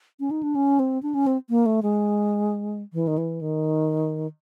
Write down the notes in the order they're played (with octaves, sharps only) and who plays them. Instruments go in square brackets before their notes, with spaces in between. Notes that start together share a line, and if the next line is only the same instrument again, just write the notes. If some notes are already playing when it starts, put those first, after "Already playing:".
[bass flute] C#4
D#4
D4
C#4
C4
D4
C#4
C4
A#3
A3
G#3
E3
D#3
E3
D#3